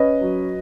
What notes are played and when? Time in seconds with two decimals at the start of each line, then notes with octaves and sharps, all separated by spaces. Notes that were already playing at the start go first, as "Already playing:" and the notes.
Already playing: C#4 B4 D#5
0.21 F#3